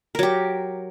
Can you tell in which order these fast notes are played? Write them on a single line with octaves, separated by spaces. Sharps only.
A#4 F#3 G4